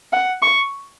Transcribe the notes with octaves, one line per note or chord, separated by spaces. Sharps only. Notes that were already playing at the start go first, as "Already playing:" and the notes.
F#5
C#6